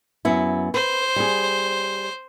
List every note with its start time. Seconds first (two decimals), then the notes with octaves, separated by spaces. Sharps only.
0.25 F#2 B3 E4
0.74 B4 C5
1.16 G3 G#4